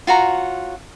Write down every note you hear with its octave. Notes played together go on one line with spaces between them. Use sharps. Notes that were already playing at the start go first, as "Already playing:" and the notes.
F4 F#4 C#5 A#5